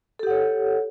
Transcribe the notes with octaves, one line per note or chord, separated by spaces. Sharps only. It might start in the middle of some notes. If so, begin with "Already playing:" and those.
G4 A4 C#5 F#5